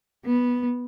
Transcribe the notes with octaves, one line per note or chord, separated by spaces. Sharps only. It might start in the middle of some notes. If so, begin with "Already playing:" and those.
B3